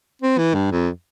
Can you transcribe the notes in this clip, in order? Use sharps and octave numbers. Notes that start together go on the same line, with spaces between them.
C4
E3
G2
F2